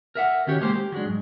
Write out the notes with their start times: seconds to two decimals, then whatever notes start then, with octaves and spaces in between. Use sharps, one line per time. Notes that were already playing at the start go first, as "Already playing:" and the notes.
0.15 A#4 E5 F#5
0.47 D#3 C#4 F#4 G4 C#5
0.61 G#3 A#3 G4 C5
0.73 G4
0.92 F#3 G#3 D4
1.06 G#2